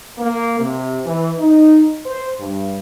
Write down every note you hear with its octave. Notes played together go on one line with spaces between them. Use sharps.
A#3
C3
E3
D#4
C5
G2